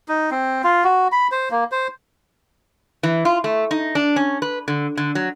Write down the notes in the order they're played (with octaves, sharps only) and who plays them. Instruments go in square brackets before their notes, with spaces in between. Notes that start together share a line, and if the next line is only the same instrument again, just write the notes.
[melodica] D#4
C4
F4
F#4
B5
C5
A#3
C5
[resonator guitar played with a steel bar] E3
F4
A3
D#4
D4
C#4
B4
D3
D3
F#3